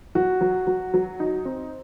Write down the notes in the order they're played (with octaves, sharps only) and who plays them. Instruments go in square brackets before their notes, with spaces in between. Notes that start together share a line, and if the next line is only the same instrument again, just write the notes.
[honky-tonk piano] F#3 [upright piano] F#4
[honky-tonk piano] F#3
F#3
F#3
D#4
C4